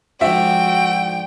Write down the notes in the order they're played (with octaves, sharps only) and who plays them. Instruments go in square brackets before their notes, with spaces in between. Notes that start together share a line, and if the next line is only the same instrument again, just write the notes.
[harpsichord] G#2 D3 F3 [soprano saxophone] F#4 [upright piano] E5 [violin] G5